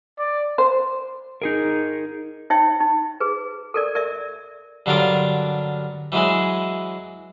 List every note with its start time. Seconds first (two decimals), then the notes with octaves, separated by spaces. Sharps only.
0.18 D5
0.58 C5
1.42 D#4 G#4 A#4
2.50 D#4 C#5 E5 G5
2.80 D#4
3.20 G#4 B4
3.74 A4 A#4 D5
3.95 A#4 D5 E5
4.86 G2 D3 F#3 F4 A#4 D6
6.12 E3 F#3 G#3 E4 G#4